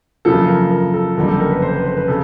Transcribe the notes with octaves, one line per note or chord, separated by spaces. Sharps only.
F#2 C#3 F3 A#3 A4
A#4
A#4
A4
F#1 F2 D3 G3 A#3 A#4
A4
A#4
B4
C5
B4
C5
B4
C#3 A4